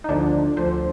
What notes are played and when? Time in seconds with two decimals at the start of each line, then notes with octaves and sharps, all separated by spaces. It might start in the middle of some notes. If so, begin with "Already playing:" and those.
0.04 D#4
0.09 D2 D3 F3 D4
0.57 D2 D3 F3 C5